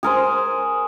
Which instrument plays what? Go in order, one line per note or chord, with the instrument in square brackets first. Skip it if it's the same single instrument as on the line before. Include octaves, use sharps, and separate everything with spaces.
[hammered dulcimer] G#4 A#4 C5